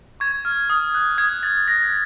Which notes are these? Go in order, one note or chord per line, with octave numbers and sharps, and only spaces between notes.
C#6 G#6
F6
D#6
F#6
D#6 G#6
D#6 A6
D#6 A#6